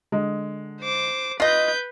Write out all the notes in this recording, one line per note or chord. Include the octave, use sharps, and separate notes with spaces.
D3 G#3
C5 D6
F4 B4 D#5 G6 C7